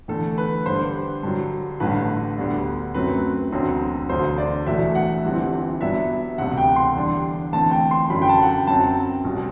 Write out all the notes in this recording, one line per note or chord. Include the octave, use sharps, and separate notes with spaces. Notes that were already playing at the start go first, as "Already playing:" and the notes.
E2 D3 A3 A4
B4
G2 D3 G3 C5
G2 D3 F#3
A1 G2 D3 A3 B4
D2 D3 G3 B3 D4
F#2 F#3 A3 C4 B4
E1 D2 D3 F#3 C4
E1 D2 D3 F#3 C5
D5
E2 B2 F#3 A3 D4 E5
F#5
G1 G2 E3 G3 C4
G2 F#3 B3 D4 E5
E1 D2 C3 G3 F#5
G5
C6
E2 D3 G3 D4
E2 D3 A3 C4 A5
G5
C6
F#2 D3 F#3 B5
G5
A5
F#5
G5
F#2 F#3 C4 A5
B1 B2 G3